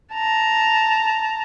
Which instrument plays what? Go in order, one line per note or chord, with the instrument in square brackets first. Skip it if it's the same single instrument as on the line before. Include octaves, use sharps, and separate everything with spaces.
[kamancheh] A5 A#5